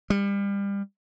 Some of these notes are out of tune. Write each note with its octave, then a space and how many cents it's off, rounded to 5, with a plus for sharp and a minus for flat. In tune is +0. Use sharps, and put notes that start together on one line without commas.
G3 +30